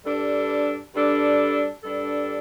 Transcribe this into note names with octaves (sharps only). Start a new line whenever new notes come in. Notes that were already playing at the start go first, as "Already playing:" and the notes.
G2 G3 D4 A4
G2 G3 D4 A4
G2 G3 D4 A4